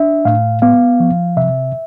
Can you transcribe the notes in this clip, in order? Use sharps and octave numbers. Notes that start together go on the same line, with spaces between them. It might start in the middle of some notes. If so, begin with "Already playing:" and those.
Already playing: D4 E5
A2 F5
B3 F5
F3
C3 E5